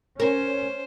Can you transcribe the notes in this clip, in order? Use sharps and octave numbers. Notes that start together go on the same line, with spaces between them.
C#4 A#4 C5